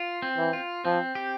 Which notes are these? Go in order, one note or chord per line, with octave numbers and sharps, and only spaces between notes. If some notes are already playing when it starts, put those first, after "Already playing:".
Already playing: F4
C4
E3
F4
F3 C4
G4